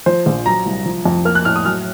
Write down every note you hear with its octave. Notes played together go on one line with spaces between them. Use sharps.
F3 C5
A#1
F#3 A#5
C2
F3
F2
A#3 F6
F#6
A2 F6
D#6
F#3 F6